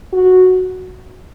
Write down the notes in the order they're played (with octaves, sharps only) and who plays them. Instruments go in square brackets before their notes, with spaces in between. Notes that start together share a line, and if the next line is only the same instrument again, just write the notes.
[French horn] F#4